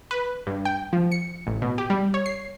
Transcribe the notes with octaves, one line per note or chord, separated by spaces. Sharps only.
B4
G2
G5
F3
C#7
A1
B2
G4
G3
C#5
C7